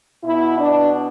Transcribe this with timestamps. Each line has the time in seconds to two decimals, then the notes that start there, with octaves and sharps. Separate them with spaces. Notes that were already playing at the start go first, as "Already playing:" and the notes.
0.23 B2 E4
0.58 D4